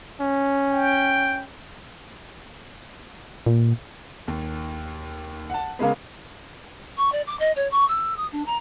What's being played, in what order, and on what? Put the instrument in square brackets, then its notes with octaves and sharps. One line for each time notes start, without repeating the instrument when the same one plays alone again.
[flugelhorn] C#4
[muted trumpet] G5
[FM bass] A#2
[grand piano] D#2
F#5 A5
[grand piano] C#3 G#3 B3 [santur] A#3 B4
[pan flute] C#6
D5
D6
D#5
C#5
C#6
E6
D#6
D4
A#5